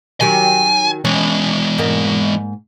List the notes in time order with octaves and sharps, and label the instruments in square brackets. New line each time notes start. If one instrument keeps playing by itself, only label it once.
[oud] D#3 F#3 G4 [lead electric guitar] G#5
[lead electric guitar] E3 G#3 [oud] C#4
[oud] G#2 A#3